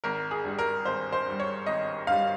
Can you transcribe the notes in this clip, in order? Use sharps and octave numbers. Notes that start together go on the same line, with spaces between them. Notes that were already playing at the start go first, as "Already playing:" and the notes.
G#1 A#4
G#4
G2 G3
A#4
G#1 C5
C5
G2 G3
C#5
G#1 D#5
G2 G3 F5